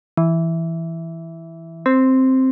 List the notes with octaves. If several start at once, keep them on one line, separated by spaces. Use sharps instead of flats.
E3
C4